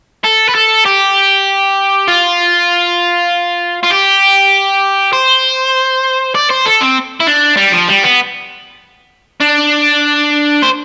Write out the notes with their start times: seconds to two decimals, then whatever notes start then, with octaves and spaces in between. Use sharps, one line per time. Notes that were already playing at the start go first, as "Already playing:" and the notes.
0.24 A4
0.49 B4
0.55 A4
0.86 G4
2.08 F4
3.83 F4
3.91 G4
5.13 C5
6.35 D5
6.50 C5
6.66 A4
6.81 C4
7.20 E4
7.27 D4
7.57 G3
7.72 F3
7.88 G3
8.03 B3
9.40 D4
10.62 C5